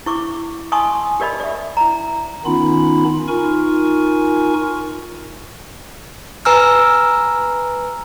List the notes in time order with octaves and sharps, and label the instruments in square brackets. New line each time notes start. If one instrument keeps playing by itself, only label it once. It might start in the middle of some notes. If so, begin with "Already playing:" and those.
[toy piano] E4 C#6 D6
D#5 G#5 A5 C6 C#6 D#6
G4 A#4 D5 D#5 B5
D5 E5
E4 A#5
[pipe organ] D#3 B3 C#4 D#4 F4 B5
D#4 F4 A#4 G#5 C#6
[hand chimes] B4 G#5 A#5 E6 F6